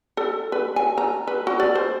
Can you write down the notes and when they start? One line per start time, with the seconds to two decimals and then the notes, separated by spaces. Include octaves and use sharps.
0.17 A4
0.52 B4
0.76 G#5
0.98 A#5
1.27 B4
1.47 F#4
1.60 D5
1.75 C5